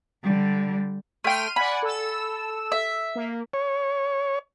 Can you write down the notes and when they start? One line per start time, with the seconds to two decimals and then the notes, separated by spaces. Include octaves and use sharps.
0.24 D3 G3
1.24 A3 G5 C6 F6 D#7
1.56 D5 F#5 G#5 B5
1.82 A4 E6
2.72 E5
3.15 A#3
3.53 C#5